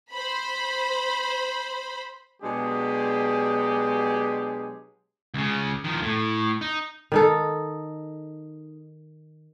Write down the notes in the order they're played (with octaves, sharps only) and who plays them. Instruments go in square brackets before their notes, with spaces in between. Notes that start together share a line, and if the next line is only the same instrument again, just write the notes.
[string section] C5 B5
[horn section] B2 F#3 G#3 D4 G4 G#4
[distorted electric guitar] C#2 C#3
D#3 F3
A2
D#4
[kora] D#3 D#4 A4